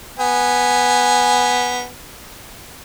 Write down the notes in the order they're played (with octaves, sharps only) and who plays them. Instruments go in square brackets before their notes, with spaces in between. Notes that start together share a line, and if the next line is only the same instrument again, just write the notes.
[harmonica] B3 G#5